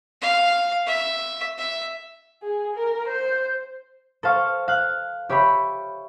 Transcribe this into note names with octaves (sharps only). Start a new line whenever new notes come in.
F5
E5
E5
G#4
A#4
C5
A4 C5 F5 C#6
F5 F#6
G4 C#5 E5 B5